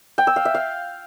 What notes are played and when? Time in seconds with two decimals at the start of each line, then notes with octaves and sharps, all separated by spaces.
0.18 G5
0.27 E6
0.36 F5
0.45 E5
0.54 F5